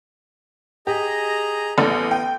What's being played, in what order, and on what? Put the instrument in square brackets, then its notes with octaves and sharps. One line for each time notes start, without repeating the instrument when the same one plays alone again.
[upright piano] G4 [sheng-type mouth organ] G#4 D#5 A#5
[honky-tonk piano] A1 [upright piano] B3 A4 [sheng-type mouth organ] D#6
[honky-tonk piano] G5